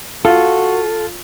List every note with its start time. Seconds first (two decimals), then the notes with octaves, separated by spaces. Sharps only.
0.25 F4 F#4 A4